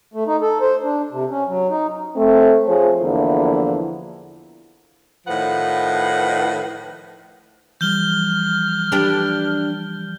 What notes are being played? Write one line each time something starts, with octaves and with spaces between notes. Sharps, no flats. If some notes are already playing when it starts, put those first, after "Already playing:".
A3
D#4
A4
C5
D4
C3
C#4
F#3
D#4
A3 C4
F3 G#4 C5 C#5
E2 D3 F3 A#3 E4
A2 D#3 F3 B4 F#5
E3 F3 G3 F6 G6 G7
D4 G4 B4